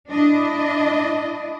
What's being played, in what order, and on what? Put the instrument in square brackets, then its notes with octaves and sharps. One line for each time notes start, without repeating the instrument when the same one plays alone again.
[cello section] D4 E4 D#5